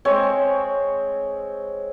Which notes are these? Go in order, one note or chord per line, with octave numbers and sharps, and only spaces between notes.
G#3 C4 C#5